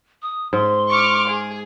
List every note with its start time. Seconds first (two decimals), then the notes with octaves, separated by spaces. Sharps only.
0.22 D#6
0.53 G#2 C6
0.89 C#6 D6 F6
1.28 G#4